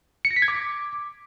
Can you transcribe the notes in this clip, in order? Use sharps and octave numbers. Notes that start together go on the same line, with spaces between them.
C#7
A#6
B6
G#6
D6